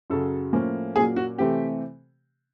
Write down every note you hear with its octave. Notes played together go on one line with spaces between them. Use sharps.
F#2 C#3 F#3 A4
A2 F3 A#3 C#4
A#2 F#3 A#3 C#4 G#4
F#4
C3 E3 A3 C4 G4